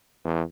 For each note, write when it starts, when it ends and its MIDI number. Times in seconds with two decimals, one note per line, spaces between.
0.25 0.42 40